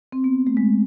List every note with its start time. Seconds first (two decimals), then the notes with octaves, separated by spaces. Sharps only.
0.12 C4
0.24 B3
0.47 A3
0.57 G#3